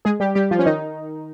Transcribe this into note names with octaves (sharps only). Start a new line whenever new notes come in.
G#3 G#4
G3 G4
G3 G4
F3 F4
C#4
D#3 D#4